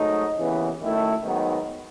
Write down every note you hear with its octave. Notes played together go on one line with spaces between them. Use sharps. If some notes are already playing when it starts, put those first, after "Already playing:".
Already playing: G#2 F#3 A3 D#4
D#2 C#3 E3 B3
F#2 D#3 A3 E4
G#2 D#3 F#3 B3 D#4